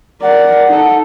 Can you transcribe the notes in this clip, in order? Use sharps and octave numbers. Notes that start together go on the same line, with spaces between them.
A#4 D5 F#5
D#4 A4